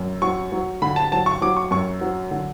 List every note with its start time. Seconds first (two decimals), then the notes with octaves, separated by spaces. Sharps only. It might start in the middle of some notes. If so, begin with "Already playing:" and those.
Already playing: F#2
0.22 F#3 C#6
0.52 F#3
0.82 D3 B5
0.96 A5
1.12 F#3 A5
1.26 C#6
1.42 F#3 D6
1.57 C#6
1.71 F#2 C#6
2.01 F#3
2.31 D3